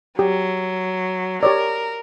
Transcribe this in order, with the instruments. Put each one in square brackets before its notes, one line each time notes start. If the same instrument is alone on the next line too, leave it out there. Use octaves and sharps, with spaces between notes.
[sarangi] F#3 [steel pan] G4
[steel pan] G4 C#5 D5 [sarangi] A#4